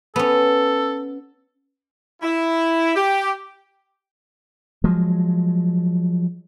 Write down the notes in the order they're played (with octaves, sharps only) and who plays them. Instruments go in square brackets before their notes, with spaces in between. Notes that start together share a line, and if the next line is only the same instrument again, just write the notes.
[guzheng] B3 C#4 [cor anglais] A4
[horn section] E4
G4
[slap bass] F3 F#3 G#3